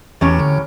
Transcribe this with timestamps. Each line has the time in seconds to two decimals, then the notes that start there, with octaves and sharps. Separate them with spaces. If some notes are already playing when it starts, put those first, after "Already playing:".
0.21 E2 A2 E3 F#3 C#4 G4 C#5
0.39 D3